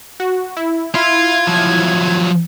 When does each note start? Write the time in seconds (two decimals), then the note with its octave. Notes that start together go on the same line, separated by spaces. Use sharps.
0.20 F#4
0.57 E4
0.95 E4 F4 G#6
1.47 F3 F#3